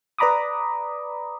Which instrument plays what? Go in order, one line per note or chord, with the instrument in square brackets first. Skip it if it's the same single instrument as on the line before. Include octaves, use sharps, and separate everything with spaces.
[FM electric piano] B4 D5 A#5 B5 D6 D#6